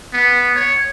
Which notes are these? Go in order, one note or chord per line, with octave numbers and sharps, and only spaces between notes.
B3
C#5